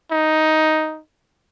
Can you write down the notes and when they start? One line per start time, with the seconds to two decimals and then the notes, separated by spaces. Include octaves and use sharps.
0.11 D#4